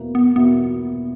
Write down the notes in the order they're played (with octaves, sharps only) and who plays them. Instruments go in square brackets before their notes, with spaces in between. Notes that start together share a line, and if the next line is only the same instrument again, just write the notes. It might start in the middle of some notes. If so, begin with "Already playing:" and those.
Already playing: [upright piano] E2 B2 A#3 E4
[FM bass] B3
[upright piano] E2 B2 A#3 E4 [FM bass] B3